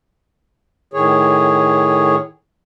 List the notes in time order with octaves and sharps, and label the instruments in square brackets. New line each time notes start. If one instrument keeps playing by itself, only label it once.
[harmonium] A2 D#3 G#4 C#5